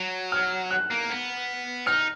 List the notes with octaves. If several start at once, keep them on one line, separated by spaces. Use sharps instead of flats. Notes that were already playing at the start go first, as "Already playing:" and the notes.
Already playing: F#3
F6
F#6
A#3
B3
D#4 F6